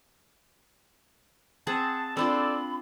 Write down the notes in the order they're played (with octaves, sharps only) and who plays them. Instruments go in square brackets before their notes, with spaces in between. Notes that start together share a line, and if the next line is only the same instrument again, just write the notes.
[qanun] C4 G#4 F#5 [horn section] A5
[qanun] C4 D4 F4 [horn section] A4 D5 [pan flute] B5